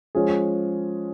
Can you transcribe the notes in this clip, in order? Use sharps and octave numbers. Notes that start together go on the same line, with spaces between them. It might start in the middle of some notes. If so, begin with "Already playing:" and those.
F3 G#3 C#4 G#4